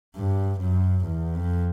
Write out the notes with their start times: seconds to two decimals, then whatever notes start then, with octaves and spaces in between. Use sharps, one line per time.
0.16 G2
0.60 F#2
1.05 E2
1.34 F2